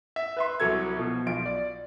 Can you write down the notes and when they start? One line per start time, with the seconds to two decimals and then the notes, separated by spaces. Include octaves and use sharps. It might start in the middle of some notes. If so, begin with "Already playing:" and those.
0.16 E5
0.37 B4 E5 C6
0.60 C2 F#3 A4 G#6
0.96 B2 F3
1.26 B1 F4 D7
1.46 D5